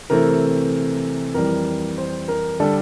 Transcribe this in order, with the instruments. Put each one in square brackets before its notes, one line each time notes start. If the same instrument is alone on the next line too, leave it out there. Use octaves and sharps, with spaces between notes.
[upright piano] C3 E3 A3 C4 A#4
F2 E3 G3 A#4
C5
A#4
D3 G3 D4 A4